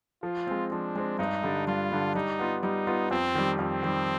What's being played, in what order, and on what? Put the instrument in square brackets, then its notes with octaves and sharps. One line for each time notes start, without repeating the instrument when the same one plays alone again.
[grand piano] F3 [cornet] F4
[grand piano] G#3 C4
[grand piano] F3 [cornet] D4
[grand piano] G#3 C4
[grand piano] G2 [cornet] D#4
[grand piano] D3 G3 D4
[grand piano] G2 [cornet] F4
[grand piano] D3 G3 D4
[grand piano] G3 [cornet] D#4
[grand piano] B3 F4
[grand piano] G3 [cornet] D#4
[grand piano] B3 F4
[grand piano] F2 [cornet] C4
[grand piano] D#3 G3
[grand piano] F2 [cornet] C4
[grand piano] D#3 G3